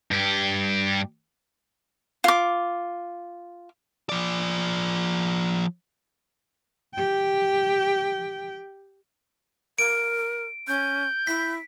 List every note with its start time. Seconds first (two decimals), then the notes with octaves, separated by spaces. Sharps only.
0.11 G2 G4
2.24 F4 D6
4.09 F3 D5
6.95 G4 G5
9.79 A#4 D7
10.68 C#4 G6
11.27 E4 B6